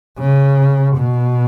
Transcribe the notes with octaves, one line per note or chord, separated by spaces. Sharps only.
C#3
B2